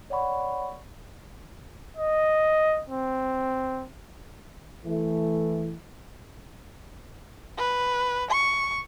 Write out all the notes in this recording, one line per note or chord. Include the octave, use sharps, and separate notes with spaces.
C#5 D5 F#5 B5 C#6
D#5
C4
E3 A3
B4
C#6